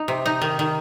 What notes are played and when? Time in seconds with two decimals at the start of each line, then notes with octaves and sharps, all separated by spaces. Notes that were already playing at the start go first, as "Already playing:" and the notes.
Already playing: D#4
0.08 C3
0.26 D#4
0.42 D#3
0.59 D#3